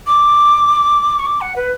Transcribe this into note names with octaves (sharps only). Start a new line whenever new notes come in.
D6
C#6
D6
F#5
B4